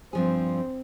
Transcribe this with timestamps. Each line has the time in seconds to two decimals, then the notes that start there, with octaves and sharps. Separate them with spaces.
0.13 G2 F3 C4 G#4